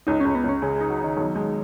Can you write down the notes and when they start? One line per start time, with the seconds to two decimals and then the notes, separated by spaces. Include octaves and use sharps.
0.07 C#2 D#4
0.20 C#2 C#4
0.35 B3
0.44 C#2 C#4
0.62 C#3 G#3
0.76 G#3 D#4
0.90 F#3
0.99 D#4
1.04 D#3
1.17 B1 D#3
1.36 G#3